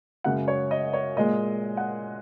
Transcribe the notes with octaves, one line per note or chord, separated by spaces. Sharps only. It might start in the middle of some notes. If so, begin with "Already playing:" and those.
F#2 C#3 G#3 F#5
C#5
D#5
C#5
A#2 G#3 D#5
F#5